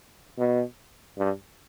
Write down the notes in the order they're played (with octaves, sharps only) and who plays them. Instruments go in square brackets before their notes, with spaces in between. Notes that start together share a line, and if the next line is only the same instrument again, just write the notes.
[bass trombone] B2
G2